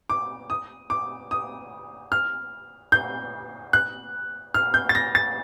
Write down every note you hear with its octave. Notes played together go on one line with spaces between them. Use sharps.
D6
D#6
D6
D#6
F6
G6
F#6
F6
G6
A6
A#6
A6